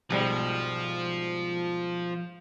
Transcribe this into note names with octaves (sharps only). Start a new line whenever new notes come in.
B1 G#2 F3 G3